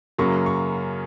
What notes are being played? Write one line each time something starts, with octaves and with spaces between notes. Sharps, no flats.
F#2 C#3 F#3 A#3 C#6
C#6